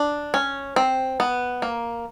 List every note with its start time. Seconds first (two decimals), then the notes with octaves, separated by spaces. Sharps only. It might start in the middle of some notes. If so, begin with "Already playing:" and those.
Already playing: D4
0.34 C#4
0.76 C4
1.20 B3
1.62 A#3